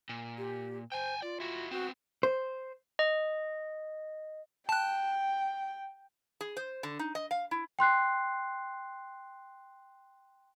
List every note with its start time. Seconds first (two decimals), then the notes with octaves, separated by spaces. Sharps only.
0.09 A#2
0.38 G4
0.92 C5 G5 G#5
1.22 F4 D5
1.40 E4 F#4
1.71 B3 C4 F#4
2.23 C5
2.99 D#5
4.69 G5 A5 F#6
6.41 G#4
6.57 C5
6.83 D3
6.99 D#4
7.15 D#5
7.31 F5
7.51 E4
7.79 G5 C6 F#6 C7